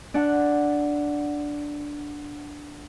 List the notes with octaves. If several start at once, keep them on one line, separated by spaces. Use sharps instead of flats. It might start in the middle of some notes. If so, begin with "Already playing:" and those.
D4 F#5